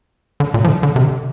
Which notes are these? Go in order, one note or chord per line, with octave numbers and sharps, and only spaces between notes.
D3
A#2
F3
D3
D3
C3
D3